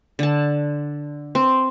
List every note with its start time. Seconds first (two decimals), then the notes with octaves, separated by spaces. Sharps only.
0.19 D3 A5
1.35 C4